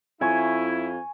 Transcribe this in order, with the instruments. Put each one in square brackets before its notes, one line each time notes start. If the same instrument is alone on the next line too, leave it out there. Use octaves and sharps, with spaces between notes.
[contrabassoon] F2 [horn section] E4 [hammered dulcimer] G#5 C#6